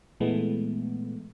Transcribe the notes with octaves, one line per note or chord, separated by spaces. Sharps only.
A#2 E3 G#3 A3 B3